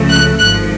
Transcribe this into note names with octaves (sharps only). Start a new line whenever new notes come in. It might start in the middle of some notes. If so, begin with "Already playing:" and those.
Already playing: C#2 C#3 F3 A3
F#6
G#1 G#2 F3 F#6